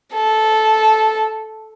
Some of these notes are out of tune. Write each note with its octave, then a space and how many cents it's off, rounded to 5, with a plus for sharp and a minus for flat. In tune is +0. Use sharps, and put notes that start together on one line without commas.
A4 -10